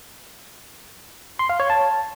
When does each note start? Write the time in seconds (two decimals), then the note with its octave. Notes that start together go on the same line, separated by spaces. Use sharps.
1.39 C6
1.49 F5
1.60 C#5
1.70 A5